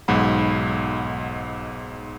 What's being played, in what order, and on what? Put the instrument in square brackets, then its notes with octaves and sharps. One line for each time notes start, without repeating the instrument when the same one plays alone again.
[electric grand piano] B1 G#2 F#5 B5